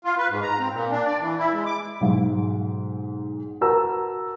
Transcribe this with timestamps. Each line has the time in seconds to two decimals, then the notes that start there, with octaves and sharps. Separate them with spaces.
0.05 F4
0.18 B4
0.29 G#2
0.42 A#5
0.59 C4
0.73 A#2
0.91 D4
1.05 D5
1.20 E3
1.38 E4
1.53 G#3
1.66 D6
2.01 B1 G#2
3.61 F#4 A#4 B4 A5 A#5 E6